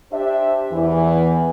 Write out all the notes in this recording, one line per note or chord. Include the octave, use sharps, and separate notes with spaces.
D4 G4 C5 E5
E2 E3